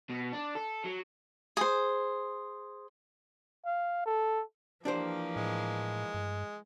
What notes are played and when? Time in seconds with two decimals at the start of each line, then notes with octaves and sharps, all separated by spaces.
0.10 B2
0.32 D4
0.55 A4
0.85 F#3
1.57 G#4 C5
3.66 F5
4.06 A4
4.85 E3 F3 A#3 D4 G4 C5
5.36 A2 G#3
6.14 G2